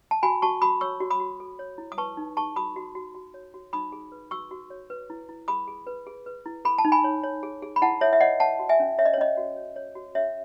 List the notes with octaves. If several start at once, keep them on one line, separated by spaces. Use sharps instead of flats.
A5
F#4 G#5 B5
F#4 A5 C#6
F#4 B5 D#6
C#5 C#6 E6
F#4
B5 D#6
F#4
A4
C#5
E4
D#6
B4 A5 C#6
D#4
G#4 A5 C#6
F#4 B5 D#6
F#4
F#4
F#4
C#5
F#4
D#4 B5 D#6
G#4
B4
F#4 C#6 E6
F#4
C#5
B4
E4
E4
G#4 B5 D#6
G#4
B4
G#4
B4
E4
A4 B5
A5
D#4
G#5 B5
C#5
C#5
G#4
G#4
B5
E4 F#5 A5
A4 C#5 E5
E5
C#5 D#5 F#5
C#5 F#5 A5
F#4
E5 G#5
C#4
C#5 E5
D#5
C#5
C#4 D#5
F#4
C#5
C#5
F#4
C#4 C#5 E5